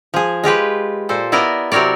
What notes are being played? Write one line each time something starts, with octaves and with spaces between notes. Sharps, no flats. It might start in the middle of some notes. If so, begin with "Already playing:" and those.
F3 G#4
G#3 F4 G4 B4
A#2 A4 C5
B3 E4 A#4 D5 D#5
C3 F#3 C4 A#4 C#5 D5